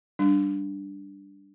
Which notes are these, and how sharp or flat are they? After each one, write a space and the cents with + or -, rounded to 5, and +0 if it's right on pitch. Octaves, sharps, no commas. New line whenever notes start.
G3 +0 D4 +0